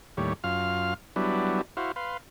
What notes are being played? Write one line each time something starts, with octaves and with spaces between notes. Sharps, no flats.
D#2 A2 G3 C#5
F#2 F4 F5 F6
F#3 G3 B3 D4 E4
E4 F#4 C5 F5
B4 F5 C6